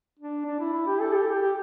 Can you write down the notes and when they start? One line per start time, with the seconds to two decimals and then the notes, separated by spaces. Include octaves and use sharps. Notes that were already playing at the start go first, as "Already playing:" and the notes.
0.19 D4
0.46 D4
0.60 E4
0.73 E4
0.87 G4
1.01 A4
1.14 G4
1.27 G4
1.42 G4